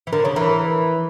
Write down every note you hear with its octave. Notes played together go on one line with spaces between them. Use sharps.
E3
D3 A#4
C#3 C#5
E3 A#4
A#4